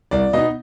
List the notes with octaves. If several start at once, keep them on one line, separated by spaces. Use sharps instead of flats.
C2 D5
B2 B3 D#4 D#5